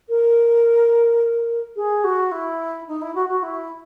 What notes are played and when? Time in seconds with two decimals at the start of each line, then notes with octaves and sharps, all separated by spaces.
0.09 A#4
1.76 G#4
2.04 F#4
2.31 E4
2.88 D#4
3.01 E4
3.15 F#4
3.29 F#4
3.43 E4